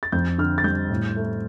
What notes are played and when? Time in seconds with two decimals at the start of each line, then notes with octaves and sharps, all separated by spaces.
0.03 A6
0.12 F2 G6
0.38 D3 F6
0.58 A6
0.64 G3 G6
0.90 A2
1.16 A3